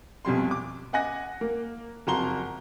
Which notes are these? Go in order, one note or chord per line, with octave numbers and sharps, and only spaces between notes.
B1 F2 G3 C6
D6
D#5 F#5 G#5 F#6 A#6
A#3
F#1 F2 F#4 A#5 C6 G7